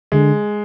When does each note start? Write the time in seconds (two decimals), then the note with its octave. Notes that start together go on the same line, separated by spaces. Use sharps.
0.12 D3 G#3